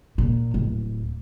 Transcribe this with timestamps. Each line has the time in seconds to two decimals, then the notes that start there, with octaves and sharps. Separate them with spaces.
0.18 A#2
0.54 D1